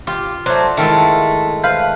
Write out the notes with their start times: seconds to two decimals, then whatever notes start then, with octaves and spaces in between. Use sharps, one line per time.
0.07 F4 G4
0.46 F#3 A3 C5 D5
0.77 D#3 G#3 A3 E4 E5 F5 A5
1.64 B4 C5 F5